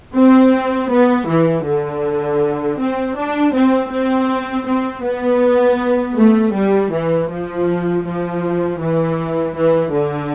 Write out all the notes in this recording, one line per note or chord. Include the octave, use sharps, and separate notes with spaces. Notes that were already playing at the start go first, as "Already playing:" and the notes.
C4
B3
E3
D3
C4
D4
C4
C4
C4
B3
A3
G3
E3
F3
F3
E3
E3
D3